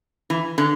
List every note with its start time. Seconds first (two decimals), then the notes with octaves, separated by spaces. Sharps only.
0.30 E3
0.58 D3